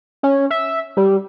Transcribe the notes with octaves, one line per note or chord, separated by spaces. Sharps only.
C#4
E5
G3